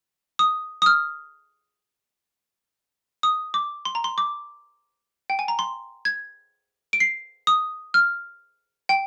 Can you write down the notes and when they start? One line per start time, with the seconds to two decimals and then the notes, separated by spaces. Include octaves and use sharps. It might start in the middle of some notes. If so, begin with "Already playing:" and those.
0.39 D#6
0.82 D#6
0.86 F6
3.23 D#6
3.54 D6
3.85 C6
3.95 A#5
4.04 C6
4.18 D6
5.30 G5
5.39 G#5
5.48 A#5
5.59 C6
6.05 G#6
6.93 D7
7.00 C7
7.47 D#6
7.94 F6
8.89 G5